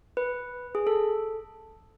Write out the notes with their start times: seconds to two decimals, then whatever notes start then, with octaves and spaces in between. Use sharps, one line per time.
0.17 B4
0.75 G#4
0.87 A4